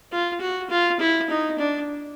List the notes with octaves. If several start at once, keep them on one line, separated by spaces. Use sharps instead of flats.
F4
F#4
F4
E4
D#4
D4